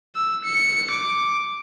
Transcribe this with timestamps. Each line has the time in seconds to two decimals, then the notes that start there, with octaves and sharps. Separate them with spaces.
0.15 E6
0.45 C#7
0.91 D6